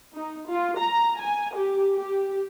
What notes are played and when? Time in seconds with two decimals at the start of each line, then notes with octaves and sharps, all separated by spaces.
0.14 D#4
0.49 F4
0.78 A#5
1.21 G#5
1.56 G4
1.97 G4